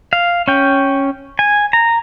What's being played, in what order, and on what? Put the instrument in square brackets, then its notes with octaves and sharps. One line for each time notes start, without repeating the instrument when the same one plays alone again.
[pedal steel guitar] F5
C#4 G5
G#5
A#5